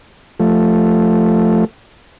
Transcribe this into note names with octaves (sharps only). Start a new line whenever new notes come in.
F3 A3